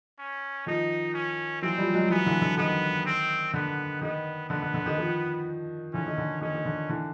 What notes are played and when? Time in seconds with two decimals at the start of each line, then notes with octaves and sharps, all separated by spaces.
0.19 C#4
0.66 D#3 F3 D#4
1.14 C#4
1.62 E3 F#3 C4
1.78 F3 G3
1.94 F#3 G#3
2.10 E3 F#3 B3
2.26 D3 E3
2.42 D3
2.58 D#3 B3
3.06 C4
3.53 D3 B3
4.01 D#3 B3
4.49 D3 B3
4.62 D3
4.74 D3
4.86 D#3
4.98 D#3 F3
5.93 D3 E3 C#4
6.06 D#3
6.18 D3
6.41 D#3 C#4
6.54 D#3
6.65 D3
6.89 D3 E3